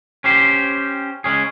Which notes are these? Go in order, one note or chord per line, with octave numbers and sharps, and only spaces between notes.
C#4 G4 C5
G#3 C#4 G#4